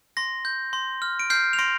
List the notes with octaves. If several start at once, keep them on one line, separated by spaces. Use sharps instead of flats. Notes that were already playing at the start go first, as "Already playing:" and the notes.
C6 A#6
G6
C6
F6
D7
F6 G6 C7
F7
C6 A#6 D7